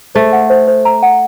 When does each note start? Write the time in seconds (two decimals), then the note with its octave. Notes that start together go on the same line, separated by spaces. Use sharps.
0.15 A3 C5
0.33 F#5
0.50 C5
0.68 C5
0.85 A#5
1.02 F#5